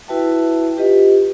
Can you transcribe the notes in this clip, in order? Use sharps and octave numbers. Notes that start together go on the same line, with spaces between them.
E4 F#4 B4 E5 G5 A5
F4 G4 B4 D#5